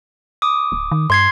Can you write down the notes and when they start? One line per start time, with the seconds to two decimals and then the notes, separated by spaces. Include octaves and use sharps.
0.42 D6 D#6
0.72 D1
0.92 D#3
1.10 G2 C6 G#6 C7